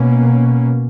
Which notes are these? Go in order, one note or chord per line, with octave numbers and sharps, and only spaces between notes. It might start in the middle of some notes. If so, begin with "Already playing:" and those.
Already playing: B2 A#3 C#4